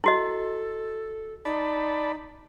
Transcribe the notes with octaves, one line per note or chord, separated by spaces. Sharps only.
E4 F#4 A4 D#5
D#4 D5 A5 B5